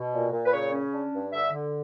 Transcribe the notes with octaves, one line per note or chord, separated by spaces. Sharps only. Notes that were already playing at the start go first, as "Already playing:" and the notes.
Already playing: B2
A#2
A#2
B4
C#3 C#5
C#4
D4
G2
D3 E5
D3